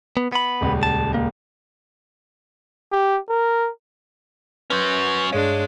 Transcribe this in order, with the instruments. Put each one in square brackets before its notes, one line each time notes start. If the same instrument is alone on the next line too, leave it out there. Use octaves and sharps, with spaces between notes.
[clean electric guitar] B3
B3 B5
[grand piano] D#1 C#2
[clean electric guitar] A5
A#3
[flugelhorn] G4
A#4
[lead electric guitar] F#3 C#4 [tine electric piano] B4 C6 G6
[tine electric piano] G2 C#5 F5 [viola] G#3 D4